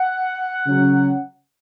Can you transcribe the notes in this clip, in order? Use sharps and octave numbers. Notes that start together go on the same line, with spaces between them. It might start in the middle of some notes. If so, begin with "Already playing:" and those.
Already playing: F#5
C#3 F#3 C#4